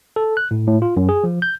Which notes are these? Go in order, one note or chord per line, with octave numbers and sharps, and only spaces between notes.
A4
F#6
A2
A2
F4
F#2
G#4
F3
G6